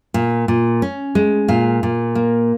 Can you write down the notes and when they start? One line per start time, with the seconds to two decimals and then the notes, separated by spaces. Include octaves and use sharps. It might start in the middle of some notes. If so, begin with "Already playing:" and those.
0.14 A#2
0.48 A#2
0.82 C#4
1.15 G#3
1.48 A#2 F5
1.83 A#2
2.15 A#3